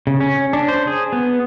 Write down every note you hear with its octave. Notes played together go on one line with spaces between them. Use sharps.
C#3
C#4
D4
C5
G#4
B3